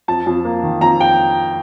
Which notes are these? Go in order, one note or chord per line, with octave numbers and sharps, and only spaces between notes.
F2 A5
F2
A#3
D#3
F2 A#5
G5